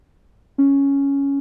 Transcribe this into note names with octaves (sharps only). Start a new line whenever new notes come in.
C#4